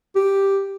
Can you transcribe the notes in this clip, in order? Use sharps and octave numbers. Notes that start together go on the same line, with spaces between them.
G4